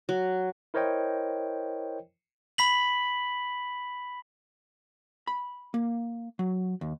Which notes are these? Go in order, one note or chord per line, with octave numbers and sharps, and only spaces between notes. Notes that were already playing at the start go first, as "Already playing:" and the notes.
F#3
E4 A#4 C5 C#5 D#5 G5
B5 B6 F#7
B5
A#3
F#3
D#2